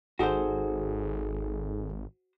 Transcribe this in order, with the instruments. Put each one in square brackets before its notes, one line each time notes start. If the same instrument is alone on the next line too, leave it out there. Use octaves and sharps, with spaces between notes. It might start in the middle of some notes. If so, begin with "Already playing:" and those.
[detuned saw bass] G#1 [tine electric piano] D#4 G#4 A4 [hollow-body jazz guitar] F#4 C5